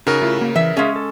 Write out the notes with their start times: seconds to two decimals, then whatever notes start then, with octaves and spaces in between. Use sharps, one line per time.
0.07 C#3 D#4 F#4 A#4
0.22 A3 E4 F4
0.37 A#3 F#4
0.56 E3 E5
0.77 G#3 C#4 G#4 E5 F5
0.96 A4